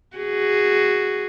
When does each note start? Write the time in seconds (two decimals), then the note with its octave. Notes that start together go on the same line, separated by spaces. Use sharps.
0.17 F#4 G#4